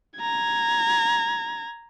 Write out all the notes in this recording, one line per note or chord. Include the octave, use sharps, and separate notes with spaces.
A#5 G#6